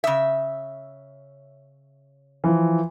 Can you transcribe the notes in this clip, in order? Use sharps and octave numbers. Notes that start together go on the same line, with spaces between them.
C#3 E5
E3 F3